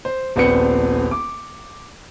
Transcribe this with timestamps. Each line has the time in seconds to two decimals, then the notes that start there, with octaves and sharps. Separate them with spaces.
0.05 C5
0.36 D#1 A#1 B3 C4 B4 C#7
1.11 D6